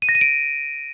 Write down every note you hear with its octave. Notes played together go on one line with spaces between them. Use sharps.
D#7
A#6
D#7
D7